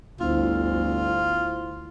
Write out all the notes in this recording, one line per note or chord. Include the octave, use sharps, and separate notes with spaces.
G1 D2 E4 F4 C5